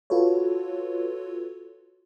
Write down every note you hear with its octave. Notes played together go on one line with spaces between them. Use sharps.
F4 F#4 A4 B4 C#5